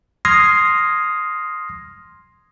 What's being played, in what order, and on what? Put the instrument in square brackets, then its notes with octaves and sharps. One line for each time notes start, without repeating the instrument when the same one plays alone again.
[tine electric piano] C6 D#6 F6 G#6 A#6 C7